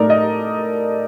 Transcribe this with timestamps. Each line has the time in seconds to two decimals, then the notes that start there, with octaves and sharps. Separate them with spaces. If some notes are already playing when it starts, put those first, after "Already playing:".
Already playing: A2 A3 D#4 A#4 D5
0.10 D#5